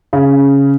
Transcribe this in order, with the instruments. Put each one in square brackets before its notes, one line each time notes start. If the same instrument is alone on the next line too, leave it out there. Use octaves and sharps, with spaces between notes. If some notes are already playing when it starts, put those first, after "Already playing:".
[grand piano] C#3